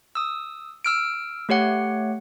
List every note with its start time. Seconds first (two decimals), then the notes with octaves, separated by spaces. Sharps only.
0.15 D#6 E6
0.85 E6 F6 D7
1.49 A3 G4 C#5 F#5